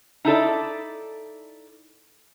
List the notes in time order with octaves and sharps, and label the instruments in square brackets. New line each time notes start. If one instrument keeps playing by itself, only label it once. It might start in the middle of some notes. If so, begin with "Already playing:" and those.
[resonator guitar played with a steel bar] D#4 E4 A4 D5